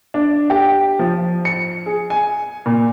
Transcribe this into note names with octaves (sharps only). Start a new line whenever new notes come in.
D4
G4
F3
C#7
G#4
G#5
A#2